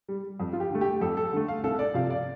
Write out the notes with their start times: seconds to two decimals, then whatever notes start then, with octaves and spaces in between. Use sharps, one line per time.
0.09 G3
0.40 F2
0.53 F4
0.60 G4
0.71 D3 A3
0.81 G4
1.01 F2 A4
1.17 A4
1.33 D3 A3
1.48 F5
1.63 C2 A4
1.79 D5
1.94 C3 F3 F5
2.10 D5